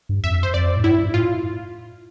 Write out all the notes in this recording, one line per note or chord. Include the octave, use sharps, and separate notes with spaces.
G2
F2 E5
C5
F2 D5
A2
G2 E4
G2
A2 F4